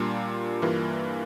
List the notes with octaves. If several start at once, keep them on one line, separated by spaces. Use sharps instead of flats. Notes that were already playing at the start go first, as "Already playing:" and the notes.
Already playing: A#2 G3 A#3 D4 F4
G2 E3 A#3 F4 A#4